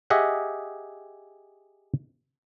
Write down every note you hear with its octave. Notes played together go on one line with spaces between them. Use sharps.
G4 G#4 D#5 E5 F#5